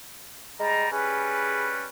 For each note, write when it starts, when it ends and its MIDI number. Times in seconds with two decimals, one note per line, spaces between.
0.60 0.92 55
0.60 0.86 56
0.60 0.92 82
0.92 1.88 55
0.92 1.88 61
0.92 1.70 68
0.92 1.88 71